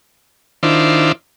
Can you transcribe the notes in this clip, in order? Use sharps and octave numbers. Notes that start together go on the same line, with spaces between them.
D#3 D4 E4 F4 C5